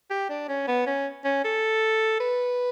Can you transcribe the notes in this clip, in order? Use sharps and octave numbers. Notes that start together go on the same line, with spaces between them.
G4
D4
C#4
B3
C#4
C#4
A4
B4